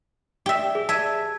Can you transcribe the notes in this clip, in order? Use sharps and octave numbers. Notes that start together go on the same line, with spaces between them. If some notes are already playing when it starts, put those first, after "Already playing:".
G4 E5
G#4
E5 A5 G#6